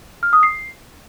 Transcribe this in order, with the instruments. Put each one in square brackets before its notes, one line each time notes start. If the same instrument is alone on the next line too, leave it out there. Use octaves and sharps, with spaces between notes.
[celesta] F6
D#6
C7